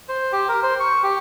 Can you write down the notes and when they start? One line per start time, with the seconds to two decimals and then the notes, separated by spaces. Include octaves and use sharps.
0.09 C5
0.32 G4
0.49 A#4
0.63 C5
0.80 C#6
1.03 G4